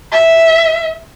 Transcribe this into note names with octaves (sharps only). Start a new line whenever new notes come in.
E5